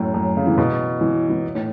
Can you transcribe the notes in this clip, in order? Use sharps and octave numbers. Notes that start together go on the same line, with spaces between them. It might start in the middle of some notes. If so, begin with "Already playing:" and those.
Already playing: F#2 A2
F#2
C#3
E3
B2
E3
E3
A2